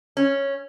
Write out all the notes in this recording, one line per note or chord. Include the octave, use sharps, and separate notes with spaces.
C#4